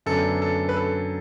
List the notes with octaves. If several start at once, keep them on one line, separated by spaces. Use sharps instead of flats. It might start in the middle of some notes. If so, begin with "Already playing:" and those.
F#2 D3 B3 D4 A4
A4
B4
A4